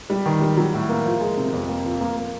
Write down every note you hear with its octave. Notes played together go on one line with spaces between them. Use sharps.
G3
D#3
G3
F#3
A2
A#3
F3
G#3
C3
F2
A#3
F3
A#3
A#3